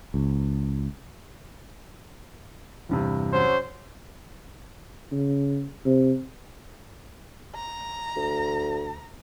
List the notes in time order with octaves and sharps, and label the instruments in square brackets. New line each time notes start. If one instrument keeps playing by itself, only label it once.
[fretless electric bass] C#2
[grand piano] E2 G2 C3
[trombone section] F#3 C#4 C5
[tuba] C#3
C3
[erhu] A#5
[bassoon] D2